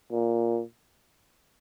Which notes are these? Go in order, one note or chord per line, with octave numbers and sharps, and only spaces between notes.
A#2